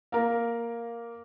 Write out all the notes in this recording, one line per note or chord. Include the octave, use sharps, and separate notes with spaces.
A#3 A#4